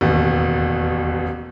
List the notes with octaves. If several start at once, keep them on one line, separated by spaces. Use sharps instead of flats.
E1 A1 D#2